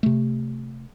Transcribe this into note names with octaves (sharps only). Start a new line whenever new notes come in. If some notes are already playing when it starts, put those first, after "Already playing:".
C3 A3